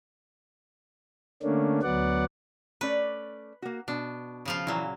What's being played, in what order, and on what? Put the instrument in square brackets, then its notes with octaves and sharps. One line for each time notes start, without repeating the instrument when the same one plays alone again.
[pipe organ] D3 A3 A#3 C#4 D4
D2 F#3 B3 D5 F#5
[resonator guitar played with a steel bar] A3 C#4 D5 [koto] B4
[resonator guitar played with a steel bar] A#3 F#4
[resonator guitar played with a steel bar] B2 [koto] D4
[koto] C#3 F3 F4
[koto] A#2 F#3 [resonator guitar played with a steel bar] E3 E5